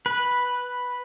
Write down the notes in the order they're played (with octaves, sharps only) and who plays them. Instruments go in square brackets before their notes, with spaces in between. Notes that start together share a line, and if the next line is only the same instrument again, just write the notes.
[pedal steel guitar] B4